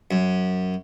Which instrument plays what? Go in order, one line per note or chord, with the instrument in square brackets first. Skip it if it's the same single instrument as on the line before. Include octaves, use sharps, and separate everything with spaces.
[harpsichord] F#2